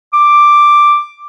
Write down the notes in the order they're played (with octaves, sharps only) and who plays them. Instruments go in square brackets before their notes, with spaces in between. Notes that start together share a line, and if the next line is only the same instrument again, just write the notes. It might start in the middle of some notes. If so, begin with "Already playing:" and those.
[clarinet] D6